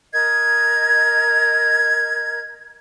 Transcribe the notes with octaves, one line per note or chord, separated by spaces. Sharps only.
A#4 D#5 G#6